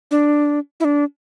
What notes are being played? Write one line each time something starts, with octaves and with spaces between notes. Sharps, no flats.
D4
E4
D4